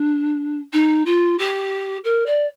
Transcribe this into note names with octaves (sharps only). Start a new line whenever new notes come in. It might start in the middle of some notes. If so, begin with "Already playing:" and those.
Already playing: D4
D#4
F4
G4
A#4
D5